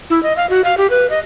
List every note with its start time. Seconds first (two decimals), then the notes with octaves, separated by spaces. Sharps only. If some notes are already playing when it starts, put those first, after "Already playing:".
0.10 E4
0.23 D#5
0.37 F5
0.50 F#4
0.64 F5
0.77 G4
0.90 B4
1.10 D#5